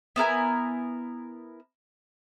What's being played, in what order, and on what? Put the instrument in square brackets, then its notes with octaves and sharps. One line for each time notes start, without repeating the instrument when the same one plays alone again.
[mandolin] B3 E4 A#4 G#5